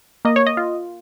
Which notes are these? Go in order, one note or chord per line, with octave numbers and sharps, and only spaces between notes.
A#3 D#5
C#5
D#5
F4